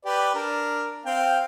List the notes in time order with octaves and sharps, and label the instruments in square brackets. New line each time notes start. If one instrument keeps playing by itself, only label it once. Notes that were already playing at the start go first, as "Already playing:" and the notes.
[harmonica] G4 B4 D5
D4 A#4
C4 F5 G5